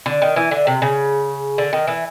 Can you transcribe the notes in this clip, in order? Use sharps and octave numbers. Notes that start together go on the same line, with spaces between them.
D3
D#3
E3
D3
C3
C#3
D3
D#3
E3